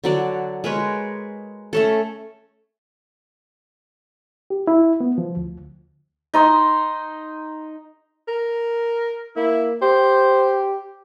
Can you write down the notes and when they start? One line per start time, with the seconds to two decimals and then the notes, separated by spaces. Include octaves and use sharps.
0.04 D3 F#3 D5
0.64 G#3 A#4 B4 C#5
1.73 A3 C#4 A4
4.50 G4
4.67 E4
5.00 B3
5.18 F3
5.37 D2
6.34 D#4 D#5 C6
8.28 A#4
9.36 A#3 E4
9.82 G4 C5